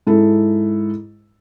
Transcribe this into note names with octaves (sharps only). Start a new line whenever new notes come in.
G#2 E4 A4